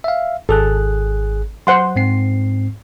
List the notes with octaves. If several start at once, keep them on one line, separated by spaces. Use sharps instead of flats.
E5 F5
G#1 G#4 A4 F#6
F#3 C5 F#5 C6
G#2 C4 C7